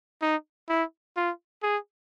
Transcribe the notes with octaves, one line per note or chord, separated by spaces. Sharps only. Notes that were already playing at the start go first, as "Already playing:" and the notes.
D#4
E4
F4
G#4